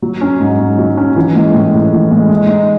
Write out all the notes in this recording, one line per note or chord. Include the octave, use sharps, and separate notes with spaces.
F#3
C#4
G#2
G#2
F#3
C#4
E3
G#3
A2
A2
E3
G#3
G#3
D#4